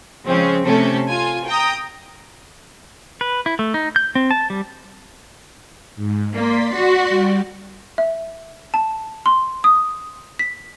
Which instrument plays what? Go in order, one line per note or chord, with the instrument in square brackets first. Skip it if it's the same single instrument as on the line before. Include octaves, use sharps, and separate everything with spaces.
[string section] C#3 F3 G#3 C4 C#4
C3 A3 C#4 A4
F4 G#5
G5 A#5 D#6
[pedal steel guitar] B4
E4
A3
D#4
G6
C4
A5
G3
[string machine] G#2
[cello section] A#3 [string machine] D5 C6 B6
[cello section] F#4
[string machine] G3
[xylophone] E5
A5
C6
D#6
B6